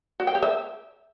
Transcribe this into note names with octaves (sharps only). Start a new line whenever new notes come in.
F#4
G5
G4
E5